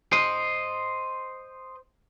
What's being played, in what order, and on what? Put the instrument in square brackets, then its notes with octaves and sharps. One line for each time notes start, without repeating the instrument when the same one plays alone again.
[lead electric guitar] C5 D#5